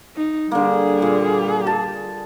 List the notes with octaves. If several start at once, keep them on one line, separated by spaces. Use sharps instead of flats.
D#4
D3 G3 A#3 G#4
A#2
A5